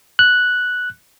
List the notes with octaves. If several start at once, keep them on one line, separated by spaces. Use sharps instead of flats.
F#6